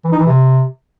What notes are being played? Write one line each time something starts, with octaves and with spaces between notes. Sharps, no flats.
E3
D#4
E3
C3